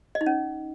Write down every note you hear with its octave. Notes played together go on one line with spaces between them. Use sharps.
D#5
D#4
C#4